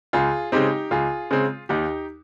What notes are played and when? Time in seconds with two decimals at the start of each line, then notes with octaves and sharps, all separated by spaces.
0.13 C#2 F4 G#4
0.52 C#3 G#3 C4 D#4 G4
0.91 C#2 F4 G#4
1.31 C#3 G#3 C4
1.69 D#2 D#4 G4